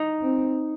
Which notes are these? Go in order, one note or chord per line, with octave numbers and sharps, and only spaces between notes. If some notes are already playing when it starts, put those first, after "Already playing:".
Already playing: D#4
C4